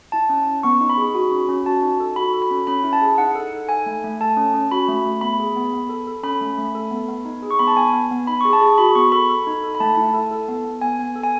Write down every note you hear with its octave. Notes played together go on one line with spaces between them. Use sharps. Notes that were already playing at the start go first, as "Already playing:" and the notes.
E4 A5
C#4
C#4
B3 C#6
D#4
B5
G#4
F#4
C#4
C#4
F#4 A5
D#4
A4
F#4 B5
A4
B5
C#4
C#4 B5
E4
A5
G#4
D#4 F#5
A4
D#4
A4 G#5
A3
A3
A4 A5
C#4
C#4
F#4 B5
A3
A3
B3 B5
G#4
B3
B3
A4
A4
C#4 B5
A3
A3
A4
B3
B3
D#4
G#4
C#6
B3 B5
A5
B3 G#5
B3
B3
D#4 B5
G#4 C#6
A5
G#4
F#4 B5
B3 C#6
A4 B5
A4
D#4
A4
B5
A3 A5
E4
A4
A4
B3
B3
B3 G#5
B3
A4
G#5